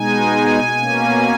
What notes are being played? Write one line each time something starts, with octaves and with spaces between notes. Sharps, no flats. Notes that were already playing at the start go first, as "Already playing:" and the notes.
Already playing: B2 G#3 D#4 G#5
B2 A#3 C#4